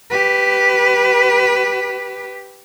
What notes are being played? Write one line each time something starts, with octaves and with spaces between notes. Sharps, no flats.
G4 B4